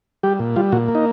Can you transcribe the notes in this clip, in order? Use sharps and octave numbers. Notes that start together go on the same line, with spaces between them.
G3 G4
A#2
G3 F4
A#2 F#4
A#3
D#4